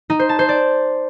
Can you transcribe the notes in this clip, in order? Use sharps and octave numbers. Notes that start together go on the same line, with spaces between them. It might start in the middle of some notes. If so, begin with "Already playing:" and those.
D#4
C5
A5
C5
D5